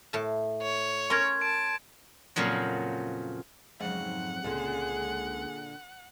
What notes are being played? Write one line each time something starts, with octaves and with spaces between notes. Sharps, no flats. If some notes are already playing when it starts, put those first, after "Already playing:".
A2 A5
C#5
C#4 A#4 C6 G#6
A5 D7
F2 A#2 C#3 F3 F#3
F2 G#2 C#3 F#3 F#5
C#2 A#2 D3 A#3 G#4